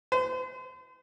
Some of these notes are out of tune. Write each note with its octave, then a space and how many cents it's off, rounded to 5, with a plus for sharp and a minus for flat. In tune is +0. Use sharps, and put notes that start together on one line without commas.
C5 -40